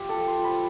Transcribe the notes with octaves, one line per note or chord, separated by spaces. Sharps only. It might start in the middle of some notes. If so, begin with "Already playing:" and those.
Already playing: F4 G4
A4
F3
C5
F4
B5